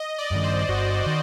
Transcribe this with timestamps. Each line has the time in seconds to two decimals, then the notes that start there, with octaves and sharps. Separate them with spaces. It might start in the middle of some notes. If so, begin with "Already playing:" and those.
Already playing: D#5
0.18 D5
0.31 G2 D#3
0.44 C5
0.69 G1 F#4
1.06 D#3